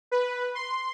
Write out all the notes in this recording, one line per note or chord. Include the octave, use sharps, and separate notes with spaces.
B4
C6